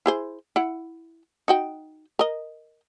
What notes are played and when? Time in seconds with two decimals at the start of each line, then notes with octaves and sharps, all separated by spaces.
0.06 E4 G#4 C5
0.56 E4 F#5
1.48 D#4 F#4 G5
2.19 A#4 D#5